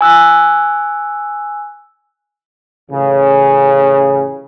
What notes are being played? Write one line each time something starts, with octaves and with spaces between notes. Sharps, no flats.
G#5 E6 F#6
A1 C#3